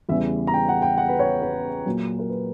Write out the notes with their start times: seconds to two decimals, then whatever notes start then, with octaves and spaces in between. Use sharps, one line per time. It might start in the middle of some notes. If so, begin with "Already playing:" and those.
0.09 E2 C#3 E3 G3 E5
0.47 A#5
0.54 G5
0.69 F#5
0.82 G5
0.98 F#5
1.08 B4
1.19 C#5
1.42 B4
1.85 A#2 F#3
2.19 A#4
2.29 B4